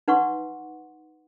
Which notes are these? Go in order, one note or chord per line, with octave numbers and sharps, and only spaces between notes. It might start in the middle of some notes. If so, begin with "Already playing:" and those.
D#4 B4 F#5 C6 C#6